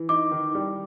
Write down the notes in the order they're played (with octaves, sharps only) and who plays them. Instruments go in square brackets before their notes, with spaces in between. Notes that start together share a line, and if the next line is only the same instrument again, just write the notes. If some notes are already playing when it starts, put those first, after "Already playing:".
Already playing: [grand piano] E3
[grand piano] D#4 [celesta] D6
[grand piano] D#3
G3